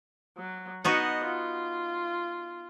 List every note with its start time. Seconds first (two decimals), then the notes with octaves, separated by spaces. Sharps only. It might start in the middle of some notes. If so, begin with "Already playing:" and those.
0.38 F#3
0.85 B3 D#4 F#4 D#5 F#5
1.26 F4